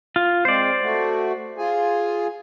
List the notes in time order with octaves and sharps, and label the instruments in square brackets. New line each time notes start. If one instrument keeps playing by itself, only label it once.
[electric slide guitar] F4
[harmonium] G#3 C4 [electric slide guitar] C5 D5
[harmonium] A3 F#4
F4 G#4 G#5